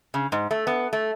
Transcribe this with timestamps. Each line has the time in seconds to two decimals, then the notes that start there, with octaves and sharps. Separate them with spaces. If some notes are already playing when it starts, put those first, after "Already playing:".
0.14 C#3
0.32 G#2
0.51 A3
0.67 B3
0.93 A3